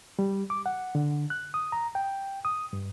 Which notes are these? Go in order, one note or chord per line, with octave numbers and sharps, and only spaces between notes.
G3
D6
F#5
D3
F#6
D#6
A#5
G5
D#6
G2